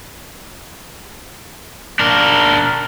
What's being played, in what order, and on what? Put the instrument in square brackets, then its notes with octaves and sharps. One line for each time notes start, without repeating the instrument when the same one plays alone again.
[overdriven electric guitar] D4 A#4